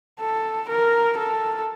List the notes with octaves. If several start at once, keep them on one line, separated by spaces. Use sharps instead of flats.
A4
A#4
A4